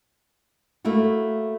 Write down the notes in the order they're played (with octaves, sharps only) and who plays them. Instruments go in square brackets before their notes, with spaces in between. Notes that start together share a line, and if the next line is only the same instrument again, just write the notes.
[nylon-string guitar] A3 A#3 E4 F#4